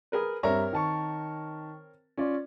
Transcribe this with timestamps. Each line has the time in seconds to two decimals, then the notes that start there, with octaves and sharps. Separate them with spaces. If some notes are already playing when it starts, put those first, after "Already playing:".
0.12 G#4 A#4 B4
0.43 G2 C4 A#4 C#5 E5 A#5
0.73 D#3 A5 C#6
2.17 C#4 F4 D5